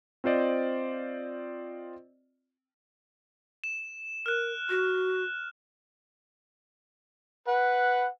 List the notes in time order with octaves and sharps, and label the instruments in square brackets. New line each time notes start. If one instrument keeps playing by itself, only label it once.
[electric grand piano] C4 F4 C5 D5 D#5
[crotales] E7
[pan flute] A#4 [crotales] F6 F#6
[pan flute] F#4
[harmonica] B4 [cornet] F#5